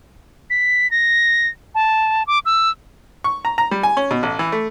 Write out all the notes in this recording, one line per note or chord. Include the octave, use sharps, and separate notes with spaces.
B6
A#6
A5
D6
E6
C#6
A#5
A#5
G3
G#5
C#4
B2
A1
E3
A3